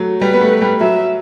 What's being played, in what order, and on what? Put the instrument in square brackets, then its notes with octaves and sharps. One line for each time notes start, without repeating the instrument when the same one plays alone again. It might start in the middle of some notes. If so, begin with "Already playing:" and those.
Already playing: [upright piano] F#3 A3
[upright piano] G3 [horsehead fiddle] B4
[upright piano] B3
A3
G3
[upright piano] F#3 [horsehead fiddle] E5